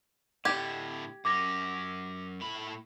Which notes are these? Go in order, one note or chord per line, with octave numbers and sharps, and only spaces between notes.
A2 D3 G4 G#6
F#2 C#4 D6 A#6
A2 B5